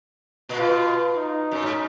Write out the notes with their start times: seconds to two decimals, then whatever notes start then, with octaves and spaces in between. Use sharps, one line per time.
0.49 A#2
0.58 B2 F4
1.16 D#4
1.51 F#2
1.63 G#2